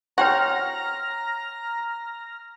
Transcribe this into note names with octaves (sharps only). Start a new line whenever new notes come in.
F#4 C#5 G5 A#5 C6 F6 A#6